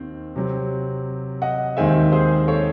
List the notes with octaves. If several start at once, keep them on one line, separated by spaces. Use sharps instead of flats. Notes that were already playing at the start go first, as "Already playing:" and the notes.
Already playing: D#2 D#3 C4
C3 F#3 C4
D#5 F#5
D#2 D#3 G#3 C4 E5 G#5
G#4 C5
A4 C#5